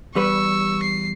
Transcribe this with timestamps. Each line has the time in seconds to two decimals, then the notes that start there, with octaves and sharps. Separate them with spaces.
0.15 E2 G3 B4 C#6 E6
0.83 C7